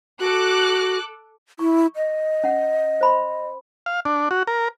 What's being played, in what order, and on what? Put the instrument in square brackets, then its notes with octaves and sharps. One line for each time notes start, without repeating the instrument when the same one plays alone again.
[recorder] F#4 [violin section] A4 D6 F#6
[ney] E4 [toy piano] C#6
[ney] D#5
[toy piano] C#4 F#5
C5 B5 C6
[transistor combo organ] F5
D4
F#4
A#4